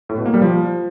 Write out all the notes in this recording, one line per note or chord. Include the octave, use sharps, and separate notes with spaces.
A2
B2
A#3
G3
F3